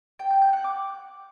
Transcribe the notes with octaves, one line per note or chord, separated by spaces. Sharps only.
G5
G6
G6
F#5
D6